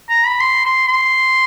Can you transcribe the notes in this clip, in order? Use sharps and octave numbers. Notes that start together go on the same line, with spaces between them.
A#5
B5
C6
C6
C6